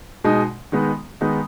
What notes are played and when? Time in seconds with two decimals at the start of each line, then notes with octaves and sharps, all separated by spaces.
0.24 B2 G#3 D#4
0.72 D#3 G#3 B3 D#4
1.21 D#3 G#3 B3 D#4